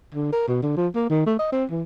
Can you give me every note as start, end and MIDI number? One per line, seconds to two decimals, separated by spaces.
0.15 0.32 50
0.32 0.48 70
0.48 0.59 47
0.63 0.74 50
0.77 0.88 53
0.95 1.09 58
1.10 1.25 51
1.26 1.35 57
1.39 1.48 75
1.52 1.65 60
1.71 1.83 52